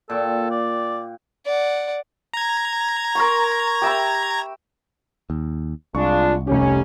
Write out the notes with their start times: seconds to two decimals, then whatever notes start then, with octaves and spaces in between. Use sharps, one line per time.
0.10 A#2 A4 G5 C#6
0.51 D5
1.45 D5 F#5
2.33 A#5 G#6
3.15 A#4 C6 C#6
3.82 G4 E5 B5
5.30 D#2
5.95 C2 G#3 D4 F4 C#6
6.47 F1 C#4 G4